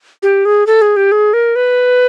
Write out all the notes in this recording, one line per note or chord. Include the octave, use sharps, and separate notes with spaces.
G4
G#4
A4
G#4
G4
G#4
A#4
B4